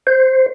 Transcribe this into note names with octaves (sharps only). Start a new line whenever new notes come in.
C5